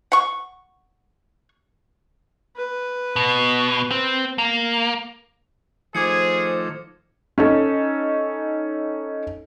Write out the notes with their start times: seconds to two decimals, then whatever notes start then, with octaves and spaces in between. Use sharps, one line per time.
0.12 F#5 C#6
2.57 B4
3.16 B2
3.91 C4
4.38 A#3
5.95 D#3 F3 A3 G#4 C5 D6 G#6 C#7
7.38 C#4 D#4 A4